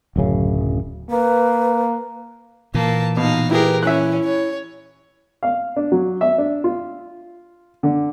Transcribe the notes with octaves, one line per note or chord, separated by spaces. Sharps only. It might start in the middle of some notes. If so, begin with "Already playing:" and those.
D1 F#2 C#3
A#3 B4
A#2 E3 A#3 A5
B2 D#4 F5
E4 G4 G#4 A#4 B4
C#4 E4 E5 F#6
C#5
F5
D4
F#3
E5
D4
F4
D3